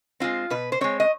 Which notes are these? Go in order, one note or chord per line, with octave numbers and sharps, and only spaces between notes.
G#3 C4 F4
B2 B4
C5
G#3 C4 C#5
D#5